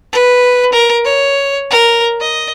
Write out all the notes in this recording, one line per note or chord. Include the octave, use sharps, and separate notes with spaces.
B4
A#4
C#5
A#4
D#5